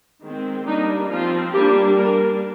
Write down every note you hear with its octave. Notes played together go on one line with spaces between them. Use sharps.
D#3 G#3 C4
G3 A#3 D4 D#4
F3 C4 F4
G3 A#3 D4 G4
G3 A#3 D4 A#4